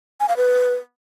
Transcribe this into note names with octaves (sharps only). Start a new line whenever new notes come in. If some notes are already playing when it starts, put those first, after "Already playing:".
G#5
F5
B4